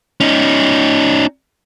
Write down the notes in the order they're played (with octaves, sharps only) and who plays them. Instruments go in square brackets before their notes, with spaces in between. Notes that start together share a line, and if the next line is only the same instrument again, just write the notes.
[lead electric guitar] C#4 D#4